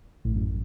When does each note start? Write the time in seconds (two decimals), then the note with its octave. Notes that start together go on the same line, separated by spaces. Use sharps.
0.25 A1 A2
0.35 F#2